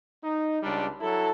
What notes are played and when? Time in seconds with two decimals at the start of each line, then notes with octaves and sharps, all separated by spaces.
0.24 D#4
0.63 C#2 G3 D4
1.01 F#3 E4 A4